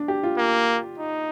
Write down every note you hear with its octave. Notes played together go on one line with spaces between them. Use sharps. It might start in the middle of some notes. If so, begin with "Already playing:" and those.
Already playing: D4
G4
F4
A#3
D#4